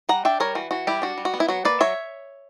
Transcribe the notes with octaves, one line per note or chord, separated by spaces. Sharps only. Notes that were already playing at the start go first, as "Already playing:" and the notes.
G3 F#5 A#5
D4 E5 G5
G3 A#4 C#5
E3 F#4
E3 F#4
G3 E4 G4
D4 F#4
G3
F#4
B3
E4
F#3 F#4
A#3 B4 D5
F#3 C#5 E5